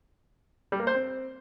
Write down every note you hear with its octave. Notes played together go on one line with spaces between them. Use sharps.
G3
A#3
C5
C4